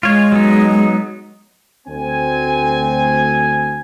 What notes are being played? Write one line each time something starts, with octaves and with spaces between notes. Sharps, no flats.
G#3 F4 C#5
F#3 B3 D#4
D2 C4 G#5